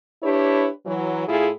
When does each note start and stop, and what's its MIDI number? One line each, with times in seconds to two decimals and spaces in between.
0.23 0.69 62
0.23 0.69 64
0.23 0.69 67
0.23 0.69 71
0.23 0.69 73
0.86 1.28 52
0.86 1.28 54
1.28 1.49 45
1.28 1.49 64
1.28 1.49 65
1.28 1.49 68